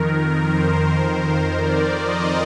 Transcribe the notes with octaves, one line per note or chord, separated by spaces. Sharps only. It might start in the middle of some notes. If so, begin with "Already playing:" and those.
Already playing: F2 D#3 A#4
C5
D5
D#5